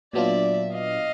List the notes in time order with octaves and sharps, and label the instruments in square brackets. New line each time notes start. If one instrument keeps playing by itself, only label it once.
[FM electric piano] A#2 F#3 B3 D4 F4 [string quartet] D5 E5
[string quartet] D#5 F5